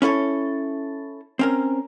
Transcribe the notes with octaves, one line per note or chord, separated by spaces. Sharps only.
C#4 E4 A4 C#5
C4 C#4 A#4